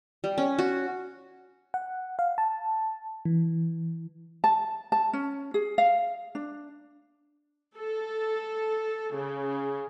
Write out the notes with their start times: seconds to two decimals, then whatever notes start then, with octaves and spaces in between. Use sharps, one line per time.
0.24 G3
0.38 C#4
0.59 F#4
1.74 F#5
2.19 F5
2.38 A5
3.25 E3
4.44 A5
4.92 A5
5.13 C#4
5.54 G#4
5.78 F5
6.35 D4
7.77 A4
9.15 C#3